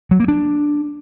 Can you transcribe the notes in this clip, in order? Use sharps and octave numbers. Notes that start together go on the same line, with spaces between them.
F#3
A#3
D4